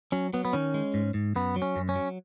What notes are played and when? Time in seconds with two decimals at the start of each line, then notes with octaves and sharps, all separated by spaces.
0.12 F#3 C#4
0.33 F#3 B3
0.45 B3
0.53 D#3 C#4
0.74 G#3
0.94 G#2
1.14 G#2
1.35 F#2 B3
1.56 F#3
1.62 C#4
1.76 F#2
1.89 C#4
1.96 F#3